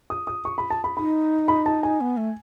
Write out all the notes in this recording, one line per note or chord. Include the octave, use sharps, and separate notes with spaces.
D#6
D#6
C#6
B5
A5
B5
D#4 B5
B5
A5
G#5
B3
A3